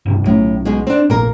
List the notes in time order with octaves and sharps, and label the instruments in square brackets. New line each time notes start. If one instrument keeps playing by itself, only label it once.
[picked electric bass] F1 G2 C3
[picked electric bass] B1 F#3 C#4 [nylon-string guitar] A2
[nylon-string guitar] B2 G#3 G#4
C4 D4
[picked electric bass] F1 A#1 A#2 [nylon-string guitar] A#3 A#4